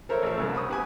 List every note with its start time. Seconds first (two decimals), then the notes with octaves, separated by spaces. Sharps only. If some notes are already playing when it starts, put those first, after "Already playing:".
0.09 A4 A#4 C5 C#5 E5
0.22 A1 A4
0.37 C2 F#2 G#3 A#3 B3
0.53 F#5 B5 C#6 D#6
0.69 G4 B4 G#5